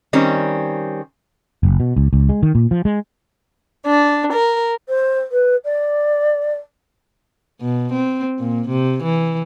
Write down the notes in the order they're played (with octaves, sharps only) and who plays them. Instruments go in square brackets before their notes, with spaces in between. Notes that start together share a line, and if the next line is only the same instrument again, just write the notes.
[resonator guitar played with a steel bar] D#3 G3 C4 C#4
[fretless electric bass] F#1
B2
C#2
C#2
G#3
D#3
A#2
F3
G#3
[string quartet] D4
A#4
[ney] C5
B4
D5
[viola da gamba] B2
C4
A#2
C3
E3